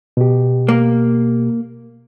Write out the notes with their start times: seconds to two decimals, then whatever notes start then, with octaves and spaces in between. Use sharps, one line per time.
0.17 B2 G4
0.69 A#3